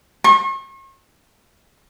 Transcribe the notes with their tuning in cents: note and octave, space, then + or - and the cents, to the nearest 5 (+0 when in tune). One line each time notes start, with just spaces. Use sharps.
C#6 -40